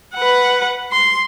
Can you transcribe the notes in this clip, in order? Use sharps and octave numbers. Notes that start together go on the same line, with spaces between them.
B4 F#5
C6